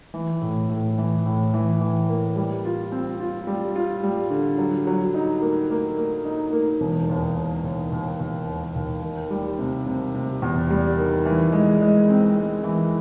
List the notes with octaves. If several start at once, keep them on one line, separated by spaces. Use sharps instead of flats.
E3
A2
A2
E3
A2
E3
E3
A#3
G3
F4
C4
F4
G3
F4
G3
D3
F#3
F#3
D#4
A#3
A#3
A#3
D#4
A#3
E1
D#2
D#2
D#2
D#2
D#2
D#2
D#2
D#3
G3
C3
C3
C3
E2
G3
D#3
E3
G#3
G#3
C4
G#3
E3